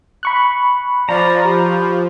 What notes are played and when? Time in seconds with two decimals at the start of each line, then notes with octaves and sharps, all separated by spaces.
0.23 B5 C#6 F#6
1.09 F3 D5 A#5
1.44 G4